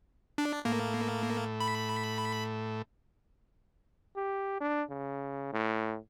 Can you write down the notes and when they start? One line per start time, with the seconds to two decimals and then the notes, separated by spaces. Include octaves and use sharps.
0.38 D4
0.65 A2 A#3
1.60 B5
4.16 G4
4.60 D4
4.90 C#3
5.53 A2